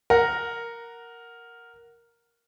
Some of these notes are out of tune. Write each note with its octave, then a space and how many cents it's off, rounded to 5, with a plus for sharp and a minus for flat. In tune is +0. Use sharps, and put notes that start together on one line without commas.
A#4 +0 F#5 +0